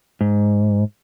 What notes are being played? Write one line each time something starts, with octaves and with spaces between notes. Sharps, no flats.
G#2